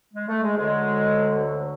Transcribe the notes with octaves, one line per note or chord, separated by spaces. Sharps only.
G#3
A3
G#3
D2 D3 F#3 G#3